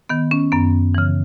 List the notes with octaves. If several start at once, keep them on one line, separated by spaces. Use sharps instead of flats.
D#3 B3
C#4
F#2 B3
C#3 E3